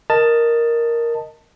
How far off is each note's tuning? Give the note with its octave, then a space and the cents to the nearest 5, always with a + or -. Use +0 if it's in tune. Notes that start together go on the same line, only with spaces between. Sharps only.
A#4 +0 D#5 +0 A5 +10